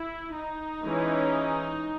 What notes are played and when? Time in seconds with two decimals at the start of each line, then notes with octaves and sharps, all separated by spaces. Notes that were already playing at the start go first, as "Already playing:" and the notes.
Already playing: E4
0.34 D#4
0.84 E3 G#3 C#4